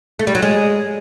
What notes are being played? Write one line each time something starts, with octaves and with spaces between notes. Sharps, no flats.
A3
G3
F#3
G#3